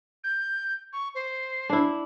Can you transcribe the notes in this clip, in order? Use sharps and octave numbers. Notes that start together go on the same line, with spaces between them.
G6
C#6
C5
D4 E4